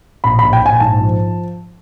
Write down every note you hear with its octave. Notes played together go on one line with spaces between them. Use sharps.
A#1 B5
A#1 B5
G5
A#1 G#5
G#2 A5
F3